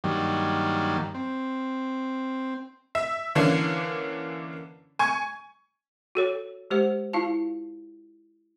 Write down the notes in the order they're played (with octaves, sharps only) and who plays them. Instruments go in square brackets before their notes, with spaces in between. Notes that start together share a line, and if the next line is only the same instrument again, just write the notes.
[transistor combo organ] G2 D#3 F#3 G3 A#3
C4
[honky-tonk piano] E5
D3 E3 A#3 C#4 D4
G#5 C#6 G#6
[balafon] F#4 A4 C#5
G#3 G4 C5 F#5
E4 F4 F5 A5